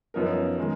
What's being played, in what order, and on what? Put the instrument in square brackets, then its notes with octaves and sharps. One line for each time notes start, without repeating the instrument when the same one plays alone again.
[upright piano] F#2 F3 B3 D#4 A#4
D#3 G#3